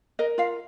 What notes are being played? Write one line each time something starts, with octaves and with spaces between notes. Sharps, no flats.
A#4 D#5
F4 F5